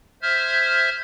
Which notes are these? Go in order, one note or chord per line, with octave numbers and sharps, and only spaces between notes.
C5 E5 F6 G#6